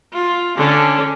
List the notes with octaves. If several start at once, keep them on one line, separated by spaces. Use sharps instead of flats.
F4
D3 C#4